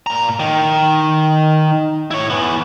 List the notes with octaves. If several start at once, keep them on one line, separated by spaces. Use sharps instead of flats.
A#2 A#5
D#3
E4 C#5
E3 B3